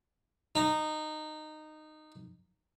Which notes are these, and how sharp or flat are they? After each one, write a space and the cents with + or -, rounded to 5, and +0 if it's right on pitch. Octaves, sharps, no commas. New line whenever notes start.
D#4 -15